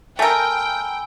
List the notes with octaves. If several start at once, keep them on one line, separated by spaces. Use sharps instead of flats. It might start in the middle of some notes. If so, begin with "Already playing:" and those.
A3 A#4 G5 G#5 B5 E6